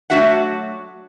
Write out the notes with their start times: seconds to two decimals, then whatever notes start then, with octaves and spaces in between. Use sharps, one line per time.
0.10 F#3 A3 D4 F#4 E5 F#5